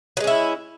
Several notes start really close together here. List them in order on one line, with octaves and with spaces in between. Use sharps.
F#3 G#3 C#4 E4